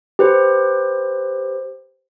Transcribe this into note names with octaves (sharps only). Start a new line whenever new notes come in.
G4 B4 C5